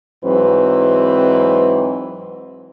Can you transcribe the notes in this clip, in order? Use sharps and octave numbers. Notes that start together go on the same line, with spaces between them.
G#2 E3 F#3 C4 B4